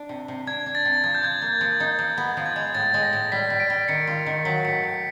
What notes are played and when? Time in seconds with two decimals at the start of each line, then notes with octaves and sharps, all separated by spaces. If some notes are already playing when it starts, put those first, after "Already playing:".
Already playing: D4
0.09 C3
0.28 C3
0.47 D4 G#6
0.66 D4
0.75 A6
0.85 C3
1.04 F3 G#6
1.15 G6
1.23 F3 G#6
1.42 A#3
1.61 F3
1.80 D#4
1.99 F3
2.18 B3
2.37 F3
2.46 G#6
2.56 G#3
2.74 A2 A6
2.94 G#3
3.03 A#6
3.13 A2
3.32 G3 B6
3.50 G3
3.60 D7
3.70 G3
3.88 D#3 C#7
4.07 F4
4.26 D#3
4.45 F#3 B6
4.65 A2 C#7
4.83 A2 C#7